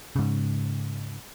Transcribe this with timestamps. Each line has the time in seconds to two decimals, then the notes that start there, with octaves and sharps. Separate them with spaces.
0.16 G#2 C#3